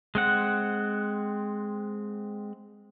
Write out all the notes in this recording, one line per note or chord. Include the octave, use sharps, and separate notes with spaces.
G#3 C4 F#5